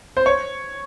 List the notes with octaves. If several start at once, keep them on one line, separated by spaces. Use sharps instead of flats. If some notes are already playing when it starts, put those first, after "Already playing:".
C5
C#5